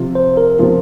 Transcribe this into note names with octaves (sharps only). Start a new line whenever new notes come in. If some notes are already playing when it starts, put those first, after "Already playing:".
Already playing: C3 F3 C4 F4
C5
A#4
C3 F3 C4 F4